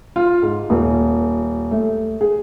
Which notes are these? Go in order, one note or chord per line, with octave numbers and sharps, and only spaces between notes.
F4
G#2
D#1
A3
G#4